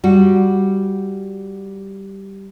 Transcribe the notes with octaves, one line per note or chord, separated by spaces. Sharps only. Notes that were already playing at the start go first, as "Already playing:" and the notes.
G3 F#4